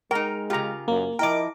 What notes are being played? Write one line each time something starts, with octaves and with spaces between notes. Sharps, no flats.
G#3 D#4 A#4 G5
C#3 F4 G4 A#5
F#2 A#3
F3 E4 A#4 D#5 G5 D6